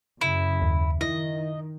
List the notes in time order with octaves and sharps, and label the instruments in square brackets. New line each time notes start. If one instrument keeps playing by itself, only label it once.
[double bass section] F#2 C#3 [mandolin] E4
[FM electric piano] D#2
[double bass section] D#3 [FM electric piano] E4 [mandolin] D#5